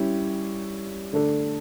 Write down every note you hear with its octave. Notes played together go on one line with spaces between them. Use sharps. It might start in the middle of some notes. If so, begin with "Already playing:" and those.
Already playing: G3 C#4 E4 G4
D3 A3 D4 A4